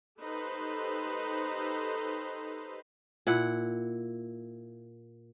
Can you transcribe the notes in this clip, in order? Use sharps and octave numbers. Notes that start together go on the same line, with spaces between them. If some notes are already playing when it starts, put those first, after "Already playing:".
D#4 G4 A4 B4 C5
A#2 E4 F#5